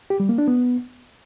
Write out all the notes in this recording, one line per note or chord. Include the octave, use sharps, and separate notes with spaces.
G4
G3
A#3
D4
B3